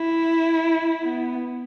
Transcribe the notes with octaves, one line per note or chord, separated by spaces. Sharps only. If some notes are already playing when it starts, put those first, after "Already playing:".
Already playing: E4
B3